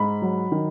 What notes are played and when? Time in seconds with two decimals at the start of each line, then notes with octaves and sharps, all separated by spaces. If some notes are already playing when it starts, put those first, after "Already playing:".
Already playing: G#2 B5
0.22 F#3
0.52 D#3